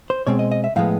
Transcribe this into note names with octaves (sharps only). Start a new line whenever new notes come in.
C5
B2 G#3 C4 C#5
D#5
D#5
E5
A2 F3 G#3 B3 F5